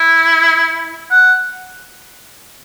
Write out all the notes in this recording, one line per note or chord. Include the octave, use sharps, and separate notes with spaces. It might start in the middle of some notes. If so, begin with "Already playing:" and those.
Already playing: E4
F#5